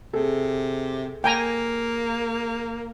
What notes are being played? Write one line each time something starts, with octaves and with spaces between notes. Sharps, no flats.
C3 G#4 A4
A#3 G5 G#5 A#5